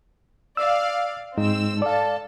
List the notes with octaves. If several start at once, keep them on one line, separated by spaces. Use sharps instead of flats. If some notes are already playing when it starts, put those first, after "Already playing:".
D5 F5 E6
G#2 G#3 C4 D#4 E6
A4 D5 F5 A5